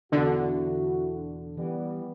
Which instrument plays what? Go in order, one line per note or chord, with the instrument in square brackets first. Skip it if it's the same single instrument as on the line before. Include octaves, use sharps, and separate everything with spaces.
[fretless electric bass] E2 B2 [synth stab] D3 [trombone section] E4 F#4
[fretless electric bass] E3 [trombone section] G3 B3